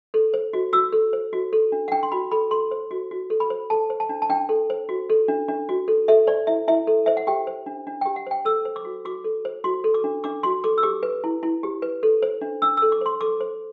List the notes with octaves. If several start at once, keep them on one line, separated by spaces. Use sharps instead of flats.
A4
C5
F#4
F#4 E6
A4
C5
F#4
A4
D4
F#5
D4 G5
C6
F#4 B5
A4 B5
A4 C6
C5
F#4
F#4
A4
B5
C5
A4 A5
C5
A5
D4
A5
D4 G5
A4
C5
F#4
A4
D4
D4
F#4
A4
A4 E5
C5 D5
E4 E5
E4 E5
A4
C5 E5
F#5
G4 G5
C5
D4
D4
G4 G5
F#5
C5 G5
A4 E6
C5
D6
F#4
F#4 D6
A4
C5
F#4 C6
A4
D6
D4
D4 D6
F#4 C6
A4 D6
E6
G4 D6
B4
E4
E4
G4
B4
A4
C5
D4
D4 E6
A4 E6
D6
C5 C6
A4 D6
C5